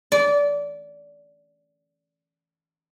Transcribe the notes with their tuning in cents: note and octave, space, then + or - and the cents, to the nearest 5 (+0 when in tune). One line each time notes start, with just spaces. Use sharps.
D5 -20